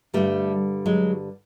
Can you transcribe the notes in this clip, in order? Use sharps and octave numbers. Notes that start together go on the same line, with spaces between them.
G2 D3 G3 A3
F#3 G#3